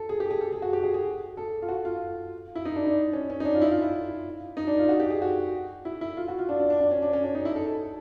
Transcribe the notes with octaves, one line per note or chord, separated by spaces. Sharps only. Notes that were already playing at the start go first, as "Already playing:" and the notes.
Already playing: A4
G#4
G4
G#4
A4
G#4
F#4
G4
G#4
G#4
A4
F4
F#4
F4
E4
D#4
D4
D4
C#4
C#4
D#4
D4
F4
E4
F4
E4
D#4
D4
F4
F#4
G4
G#4
F#4
E4
E4
F4
F#4
F4
D4
D4
D4
D4
C#4
D4
C#4
D4
D#4
E4
A4
A4